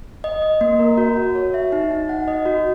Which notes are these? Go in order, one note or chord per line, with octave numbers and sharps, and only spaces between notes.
D#5
D#5
A#3
A#4
F#4
F#4
C#5
E5
D#4
D#4
F#5
D#5
F#4